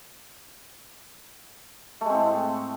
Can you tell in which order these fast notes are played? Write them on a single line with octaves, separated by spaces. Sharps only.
A3 G#3 C4 A2